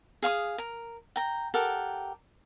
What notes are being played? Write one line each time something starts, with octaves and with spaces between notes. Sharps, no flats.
G#4 F5 C#6 D#6
A#4
G5 A#5
G4 A4 A#4 F#5